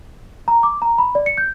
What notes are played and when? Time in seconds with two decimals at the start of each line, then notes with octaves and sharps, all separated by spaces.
0.48 A#5
0.63 D6
0.82 A#5
0.98 B5
1.15 D5
1.26 C#7
1.38 G6